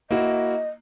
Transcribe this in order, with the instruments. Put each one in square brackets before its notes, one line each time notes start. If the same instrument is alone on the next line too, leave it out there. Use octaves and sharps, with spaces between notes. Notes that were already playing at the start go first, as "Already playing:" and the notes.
[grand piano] A#3 E4 F#4 [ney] D#5